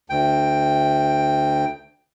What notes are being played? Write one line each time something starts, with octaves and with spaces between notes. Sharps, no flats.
D2 G5